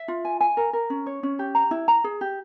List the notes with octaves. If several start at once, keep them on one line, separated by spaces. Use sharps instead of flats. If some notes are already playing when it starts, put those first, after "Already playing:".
Already playing: E5
F4
G#5
G#5
A#4
A#4
C#4
C#5
C#4
G4
A#5
E4
A#5
G#4
G4